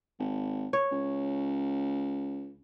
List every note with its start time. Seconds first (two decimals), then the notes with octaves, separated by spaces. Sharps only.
0.20 G#1
0.73 C#5
0.91 C#2